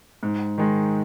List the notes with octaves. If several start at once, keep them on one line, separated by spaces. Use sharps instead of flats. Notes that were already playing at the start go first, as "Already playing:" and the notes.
G#2
D#3 G#3